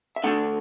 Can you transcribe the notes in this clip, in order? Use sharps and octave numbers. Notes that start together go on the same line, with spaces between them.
E5
D3 A3 D4 F#5